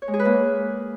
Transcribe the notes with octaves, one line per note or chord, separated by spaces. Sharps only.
C#5
G#3
G#4
B4
A#3